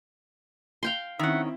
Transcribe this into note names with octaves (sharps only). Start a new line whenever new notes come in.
F5 G5 C6
D#3 C4 C#4 E4 E5 F#5